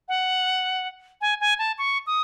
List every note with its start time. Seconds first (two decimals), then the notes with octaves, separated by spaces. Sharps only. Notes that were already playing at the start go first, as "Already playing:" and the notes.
0.08 F#5
1.21 G#5
1.41 G#5
1.59 A5
1.78 C#6
2.07 D#6